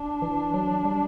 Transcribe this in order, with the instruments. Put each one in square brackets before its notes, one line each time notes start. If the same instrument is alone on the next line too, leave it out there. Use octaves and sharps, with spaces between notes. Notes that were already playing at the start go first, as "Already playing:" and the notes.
Already playing: [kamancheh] D4
[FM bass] E3
F#3
G3